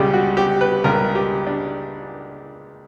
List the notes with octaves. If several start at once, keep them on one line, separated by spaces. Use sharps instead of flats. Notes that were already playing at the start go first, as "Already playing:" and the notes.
Already playing: C#2 C#3 G3 G4
F#4
G4
B4
C#2 C#3 G3 A#4
G4
D4